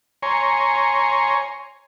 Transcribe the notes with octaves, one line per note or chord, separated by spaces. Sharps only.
C#5 G#5 A#5 C6 C#6